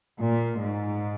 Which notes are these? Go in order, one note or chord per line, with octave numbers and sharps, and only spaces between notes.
A#2
G#2